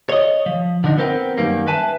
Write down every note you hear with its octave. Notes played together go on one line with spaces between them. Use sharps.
C#5 D#5
F3
D3 F3 D4 D#4
B3 C4 A#4 F5 G5
F#2 D#3 G3 A#3
B4 E5 G#5 A5